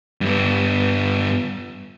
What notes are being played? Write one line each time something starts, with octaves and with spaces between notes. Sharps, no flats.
G2 B3